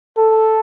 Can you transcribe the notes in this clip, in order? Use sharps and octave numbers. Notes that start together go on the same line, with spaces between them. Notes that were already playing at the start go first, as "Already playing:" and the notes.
A4